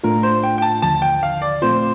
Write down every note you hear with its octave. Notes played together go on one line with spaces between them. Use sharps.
A2 A3 D4 F4 A#4
C5
G5
G5
A5
D#2 D3 F3 A5
G5
F5
D5
A#2 A3 C4 F4 C5